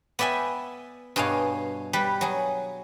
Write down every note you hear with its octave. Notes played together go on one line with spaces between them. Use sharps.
B3 D5 E5 G5 G#5
G2 B2 G#4 C#5 F5
G3 B4
F#3 G#4